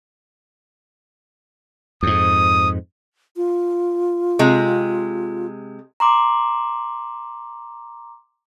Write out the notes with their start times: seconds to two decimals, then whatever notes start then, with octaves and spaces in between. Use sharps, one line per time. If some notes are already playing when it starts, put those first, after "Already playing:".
2.03 F2 G#2 D#6
3.37 F4
4.39 C3 G#3
6.00 A#5 C6 D6